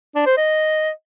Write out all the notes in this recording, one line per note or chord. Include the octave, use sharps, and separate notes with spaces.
D4
C5
D#5